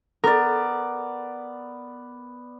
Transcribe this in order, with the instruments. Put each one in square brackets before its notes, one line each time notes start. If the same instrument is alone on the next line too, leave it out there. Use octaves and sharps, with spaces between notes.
[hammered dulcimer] B3 D5 [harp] A#4